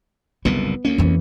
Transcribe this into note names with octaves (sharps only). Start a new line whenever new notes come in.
F#1 C2 A#2 B3
D2 A#3 C#4
F2 E3